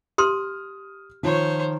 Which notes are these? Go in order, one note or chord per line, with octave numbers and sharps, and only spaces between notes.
G4 C6 D#6 F6
D#3 F3 C5 C#5